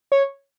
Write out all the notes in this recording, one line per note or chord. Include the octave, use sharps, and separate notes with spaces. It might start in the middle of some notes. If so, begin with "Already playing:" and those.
C#5